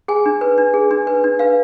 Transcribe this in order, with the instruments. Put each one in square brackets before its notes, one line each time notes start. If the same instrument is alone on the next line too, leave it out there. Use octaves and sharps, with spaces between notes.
[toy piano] G#4 G#5
D4
B4
D4
G#4
D4
B4
D4
B4 F5